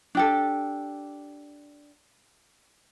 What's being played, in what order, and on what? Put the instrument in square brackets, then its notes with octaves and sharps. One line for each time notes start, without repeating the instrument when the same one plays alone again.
[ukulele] D4 G4 A4